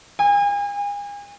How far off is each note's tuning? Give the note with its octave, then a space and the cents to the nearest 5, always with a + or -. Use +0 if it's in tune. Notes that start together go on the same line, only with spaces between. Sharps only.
G#5 -40